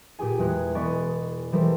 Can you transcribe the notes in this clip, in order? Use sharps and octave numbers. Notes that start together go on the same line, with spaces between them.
A#2 G4 G#4 G#5
E2 G#3 F#6
E1 B3 D5 D#5 G#5 C#6
E3 G3 G#3 A4 A#4 C5